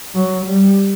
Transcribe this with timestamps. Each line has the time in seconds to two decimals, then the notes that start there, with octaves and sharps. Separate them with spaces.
0.14 F#3
0.46 G3